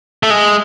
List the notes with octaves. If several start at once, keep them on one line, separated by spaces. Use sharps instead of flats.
A3
G#3